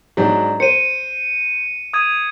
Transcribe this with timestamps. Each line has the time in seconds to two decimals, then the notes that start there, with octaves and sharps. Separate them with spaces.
0.17 G#2 F#3 D4
0.60 C5 C#7 D#7
1.93 D#6 G#6 D#7